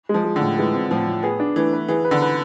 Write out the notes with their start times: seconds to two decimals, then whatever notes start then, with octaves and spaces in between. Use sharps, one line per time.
0.09 F3 G#3
0.24 G#3
0.36 D3
0.41 A2
0.58 E3 G#3
0.74 C4
0.91 A2 F3
1.07 A2
1.23 B3 G#4
1.40 D4
1.56 E3 A3
1.73 B4
1.88 E3 G#4
2.05 B4
2.11 D3
2.22 B4